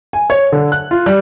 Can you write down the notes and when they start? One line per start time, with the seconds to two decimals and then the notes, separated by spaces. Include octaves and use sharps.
0.13 G#5
0.30 C#5
0.52 D3
0.72 F#6
0.91 F4
1.06 G3